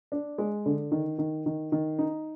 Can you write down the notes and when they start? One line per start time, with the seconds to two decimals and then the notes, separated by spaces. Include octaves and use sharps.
0.12 D4
0.38 G#3
0.66 D3
0.91 D#3
1.18 D#3
1.46 D#3
1.72 D#3
1.99 D#4